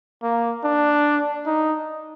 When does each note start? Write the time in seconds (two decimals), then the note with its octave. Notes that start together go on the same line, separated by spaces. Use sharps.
0.23 A#3
0.64 D4
1.47 D#4